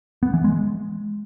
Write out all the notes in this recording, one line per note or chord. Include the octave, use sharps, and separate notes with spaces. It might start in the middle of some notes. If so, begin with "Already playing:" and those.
B3
E3
G#3